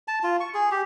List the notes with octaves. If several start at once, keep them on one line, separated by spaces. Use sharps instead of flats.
A5
F4
C#6
G#4
G4